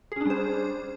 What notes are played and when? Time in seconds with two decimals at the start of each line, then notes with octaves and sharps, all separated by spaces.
0.12 G#4
0.16 C#4
0.21 D4
0.26 G3
0.30 C5